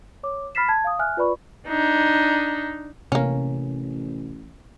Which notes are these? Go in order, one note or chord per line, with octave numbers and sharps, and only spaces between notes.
C#5 D6
B5 F6 A6 B6 C7 E7
A5 G#6
F5 D#6
E5 G#5 F6 F#6
F4 B4 D5 B5 C#6
D4 D#4
A1 C3 A#3 C#4